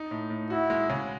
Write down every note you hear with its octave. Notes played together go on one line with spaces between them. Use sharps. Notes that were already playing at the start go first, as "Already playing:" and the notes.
Already playing: D#4
A2
A2
E4 F#4
G#3
C#3